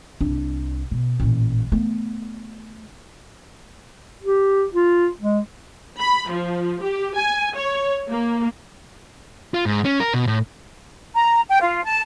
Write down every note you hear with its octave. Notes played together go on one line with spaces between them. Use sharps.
C2 D4
B2
A1 A#2
A3 B3
G4
F4
G#3
B5
F3
G4
G#5
C#5
A#3
F4
G#2
C#4
A#4
B2
A2
A#5
G5
F4
A5